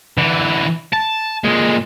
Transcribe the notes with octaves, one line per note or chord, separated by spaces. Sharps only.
D3 E3
A5
A#2 G#3